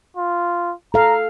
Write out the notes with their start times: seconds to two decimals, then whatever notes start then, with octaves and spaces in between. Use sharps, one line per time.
0.17 F4
0.94 A4 F5 A#5